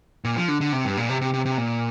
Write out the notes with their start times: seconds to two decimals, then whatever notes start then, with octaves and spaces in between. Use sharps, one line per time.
0.25 A#2
0.37 F3
0.48 D3
0.61 D3
0.72 C3
0.85 G2
0.97 A#2
1.10 C3
1.21 C3
1.34 C3
1.46 C3
1.58 A#2